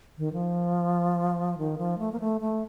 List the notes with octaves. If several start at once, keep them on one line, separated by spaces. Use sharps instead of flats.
D#3
F3
D#3
F3
A3
A#3
A3
A3